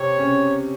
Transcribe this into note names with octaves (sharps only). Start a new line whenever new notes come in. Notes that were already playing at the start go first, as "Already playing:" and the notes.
Already playing: C3 C4 C#5
C#3 C#4